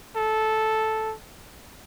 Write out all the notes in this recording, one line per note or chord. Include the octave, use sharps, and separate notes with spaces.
A4